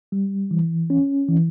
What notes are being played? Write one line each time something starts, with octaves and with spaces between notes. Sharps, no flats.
G3
E3
C#4
E3